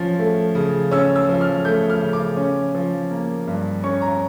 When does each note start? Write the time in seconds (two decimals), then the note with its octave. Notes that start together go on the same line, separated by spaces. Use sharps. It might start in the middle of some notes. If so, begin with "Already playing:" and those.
Already playing: F3 C#4
0.19 A3
0.55 C#3
0.91 C#4 E6
1.16 E6
1.29 F3
1.41 F6
1.65 A3 G6
1.90 F6
2.01 C#3
2.13 D6
2.37 C#4
2.75 F3
3.11 A#3
3.47 G2
3.84 C#4 C#6
4.02 A#5